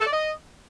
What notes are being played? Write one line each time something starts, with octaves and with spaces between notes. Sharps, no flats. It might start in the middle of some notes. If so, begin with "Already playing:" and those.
A4
D5
D#5